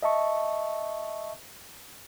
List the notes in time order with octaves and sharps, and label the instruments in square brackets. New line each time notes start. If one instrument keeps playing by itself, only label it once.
[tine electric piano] D#5 E5 A5 C#6